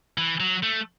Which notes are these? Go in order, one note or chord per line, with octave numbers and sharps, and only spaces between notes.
E3
F#3
A3